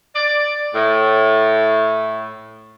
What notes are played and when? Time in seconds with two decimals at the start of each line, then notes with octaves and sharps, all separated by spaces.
0.16 D5
0.75 A2